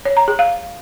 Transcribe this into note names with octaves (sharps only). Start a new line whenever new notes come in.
C#5
A#5
G#4
F5